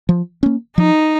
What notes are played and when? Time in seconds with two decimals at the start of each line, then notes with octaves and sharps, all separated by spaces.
0.09 F3
0.43 A#3 C#4
0.77 F3 D#4